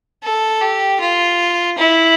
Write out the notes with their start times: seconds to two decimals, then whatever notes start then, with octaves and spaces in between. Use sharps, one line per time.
0.23 A4
0.61 G4
1.00 F4
1.78 E4